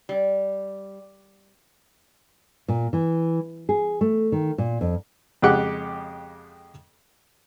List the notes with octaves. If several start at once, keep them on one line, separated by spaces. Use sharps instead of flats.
G3
A#2
E3
G#4
A3
D#3
A#2
F2
F2 C#3 G#3 G4 F#5 D6